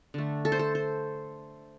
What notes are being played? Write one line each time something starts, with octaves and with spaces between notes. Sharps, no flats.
D3 A3
A4
C5
A4
C5